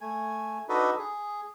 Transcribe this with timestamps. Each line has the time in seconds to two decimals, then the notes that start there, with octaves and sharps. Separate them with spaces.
0.01 A3 G#5
0.69 D4 D#4 F#4 A4 B4 D#5
0.99 G#4